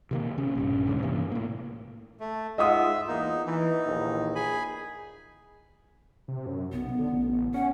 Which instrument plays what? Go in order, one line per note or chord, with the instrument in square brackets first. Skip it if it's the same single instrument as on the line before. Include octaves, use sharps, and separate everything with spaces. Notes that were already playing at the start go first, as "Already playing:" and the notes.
[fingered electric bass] C3 D#3 A#3
C3 C#4
A#1 G2 C#4
D#2 G#2 C#3
G2 C3 E3 A#3
A2 A#3
[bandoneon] A3
[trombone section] G#2 F4 [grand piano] D#5 F#5 D#6 [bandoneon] E5
[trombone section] E2 A#3 [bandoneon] D#4
[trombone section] E3 [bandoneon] D#4
[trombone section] A#1 D#2 E3
[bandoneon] G#4 G#5 B5
[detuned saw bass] C3
F#2
[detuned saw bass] B1 [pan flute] B3
[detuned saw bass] D3
A1
[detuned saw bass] C#4 [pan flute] F#5